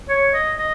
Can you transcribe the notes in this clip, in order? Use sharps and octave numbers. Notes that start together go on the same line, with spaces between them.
C#5
D#5
D#5